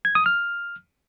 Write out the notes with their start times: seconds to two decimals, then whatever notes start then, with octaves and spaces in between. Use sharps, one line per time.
0.05 G#6
0.15 D#6
0.26 F6